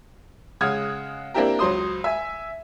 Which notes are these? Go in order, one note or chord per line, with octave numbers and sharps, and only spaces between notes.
C#3 G#3 F#5 D#6 F6 G#6
A#3 C4 D4 E4 G4 A#4
C#2 F#3 C5 C6 D#6
E5 G#5